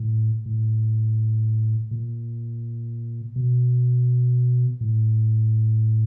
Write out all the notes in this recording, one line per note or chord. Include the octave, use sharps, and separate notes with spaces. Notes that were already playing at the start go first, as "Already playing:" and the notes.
Already playing: A2
A2
A#2
B2
A2